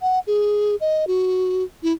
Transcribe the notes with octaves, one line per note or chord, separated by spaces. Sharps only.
F#5
G#4
D#5
F#4
E4